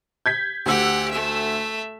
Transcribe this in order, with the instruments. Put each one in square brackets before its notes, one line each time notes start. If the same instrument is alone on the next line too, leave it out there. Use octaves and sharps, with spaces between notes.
[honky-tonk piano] G6 G#6 B6
[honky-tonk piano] D2 E6 [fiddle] G4 F#5
[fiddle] A3 E5